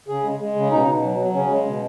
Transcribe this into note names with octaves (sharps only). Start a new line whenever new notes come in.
C#3 G#4
G#3
G#3
C#3
B2 D#4
B2
F#3
F#3
C#3 C#4
G#3
B2